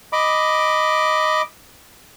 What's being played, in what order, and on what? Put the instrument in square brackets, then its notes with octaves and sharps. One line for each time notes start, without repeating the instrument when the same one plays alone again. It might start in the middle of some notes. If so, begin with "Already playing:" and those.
[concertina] D#5 B5 D6